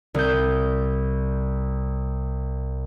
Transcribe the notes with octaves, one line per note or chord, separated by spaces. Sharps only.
C2 G6